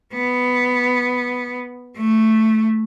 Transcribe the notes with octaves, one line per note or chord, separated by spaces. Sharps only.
B3
A3